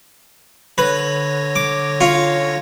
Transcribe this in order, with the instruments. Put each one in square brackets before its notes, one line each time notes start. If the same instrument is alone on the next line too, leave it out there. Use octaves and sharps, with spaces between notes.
[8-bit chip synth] D3 C#5 A#6 [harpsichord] B4
[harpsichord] D6
C#4 F4